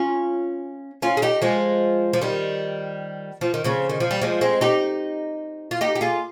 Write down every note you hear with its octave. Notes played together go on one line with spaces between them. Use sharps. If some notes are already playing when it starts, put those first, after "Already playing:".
Already playing: C#4 F4
C#4 F4
G#4
D#4 G4
F3 G#3
F3
D#3 G3
F3
D#3
C#3 F3
D#3
F3
G3
F3 G#3
G#3 C4
D#4 G4
F4
D#4 G4
G4
F4 G#4